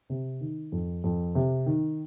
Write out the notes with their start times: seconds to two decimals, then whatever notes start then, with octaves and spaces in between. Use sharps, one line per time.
0.10 C3
0.41 D#3
0.72 F2
1.04 F2
1.35 C3
1.66 D#3